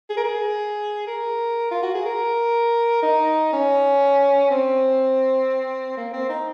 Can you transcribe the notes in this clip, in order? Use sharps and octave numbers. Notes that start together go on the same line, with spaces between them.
G#4
A#4
G#4
A#4
F4
F#4
G#4
A#4
D#4
C#4
C4
A#3
C4
D#4